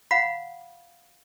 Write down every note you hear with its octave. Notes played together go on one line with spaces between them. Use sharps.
F5 F#5 B5